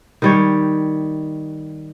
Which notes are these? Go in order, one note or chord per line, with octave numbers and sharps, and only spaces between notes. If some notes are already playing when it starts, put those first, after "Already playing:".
D#3 G3 C#5